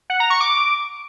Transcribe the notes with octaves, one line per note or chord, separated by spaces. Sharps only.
F#5
A#5
C#6
D6